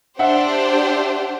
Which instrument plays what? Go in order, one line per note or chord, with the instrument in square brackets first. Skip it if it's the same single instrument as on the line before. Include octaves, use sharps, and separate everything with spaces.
[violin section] D4 G4 C5 [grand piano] E5 F#5